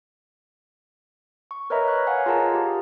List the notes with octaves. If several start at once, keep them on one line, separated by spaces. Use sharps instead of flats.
C#6
A#4 B4 C#5 D#5 E5 A#5
C#6 F#6
C#5 F5 F#5 G#5
F4 G#4 A#4 A5 A#5
G4